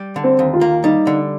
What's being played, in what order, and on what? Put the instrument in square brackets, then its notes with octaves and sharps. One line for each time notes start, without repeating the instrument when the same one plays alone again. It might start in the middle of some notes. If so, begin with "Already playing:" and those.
Already playing: [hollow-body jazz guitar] G3
D3
[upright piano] C4
[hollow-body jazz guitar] D#2
[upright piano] F4
[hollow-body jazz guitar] A#3
[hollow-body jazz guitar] G3 [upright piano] D#4
[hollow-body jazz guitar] D3